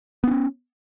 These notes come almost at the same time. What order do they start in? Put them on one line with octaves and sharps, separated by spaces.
B3 D4 C#4